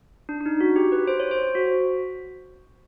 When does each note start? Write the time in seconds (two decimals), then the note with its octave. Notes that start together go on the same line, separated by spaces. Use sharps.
0.29 D4
0.41 D4
0.46 D#4
0.60 F#4
0.76 G4
0.92 B4
1.07 C5
1.20 C#5
1.31 C5
1.55 F#4